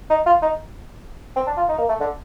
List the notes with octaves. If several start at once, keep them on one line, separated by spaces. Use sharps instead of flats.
D#4
F4
D#4
C4
D4
F4
D#4
A#3
A3
D3